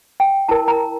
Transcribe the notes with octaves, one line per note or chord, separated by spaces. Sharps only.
G5
E4 A#4 A5
A#5